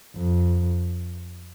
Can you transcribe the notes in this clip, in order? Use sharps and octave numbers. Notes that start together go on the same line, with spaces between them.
F2